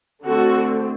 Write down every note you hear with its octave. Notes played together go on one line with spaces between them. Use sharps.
D3 A3 C4 F#4 A4